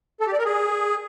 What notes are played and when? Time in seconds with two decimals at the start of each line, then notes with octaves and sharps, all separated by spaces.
0.20 A4
0.26 G4
0.33 D5
0.39 A#4
0.45 G#4